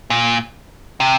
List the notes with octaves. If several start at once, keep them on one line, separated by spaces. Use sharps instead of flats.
A#2
C3